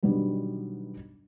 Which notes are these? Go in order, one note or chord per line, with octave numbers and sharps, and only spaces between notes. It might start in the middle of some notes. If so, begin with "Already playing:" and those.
B2 D3 D#3 F#3 G3 B3